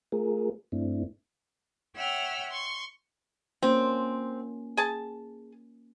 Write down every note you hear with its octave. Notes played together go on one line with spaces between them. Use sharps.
A3 F4 G#4 A#4
G2 A3 C4 D4 E4
C#5 E5 F#5 G5 E6 F6
C6 C#6
A#3 C4 C#4 F4
G#4 A5